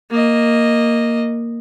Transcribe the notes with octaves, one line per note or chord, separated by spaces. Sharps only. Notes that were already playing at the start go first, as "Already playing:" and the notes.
A#3 D#5